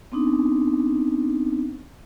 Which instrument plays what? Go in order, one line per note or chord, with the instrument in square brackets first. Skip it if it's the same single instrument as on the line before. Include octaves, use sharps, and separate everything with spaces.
[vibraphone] B3 C4 D4 D#4